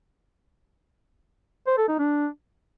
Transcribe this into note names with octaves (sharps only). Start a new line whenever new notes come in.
C5
A4
D#4
D4